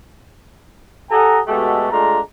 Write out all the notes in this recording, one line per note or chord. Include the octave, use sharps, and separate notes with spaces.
G4 A4 D#5 F#5 G#5 A#5
B2 G#3 A3 F#4 G4 A4
G#3 A3 D4 F4 A#5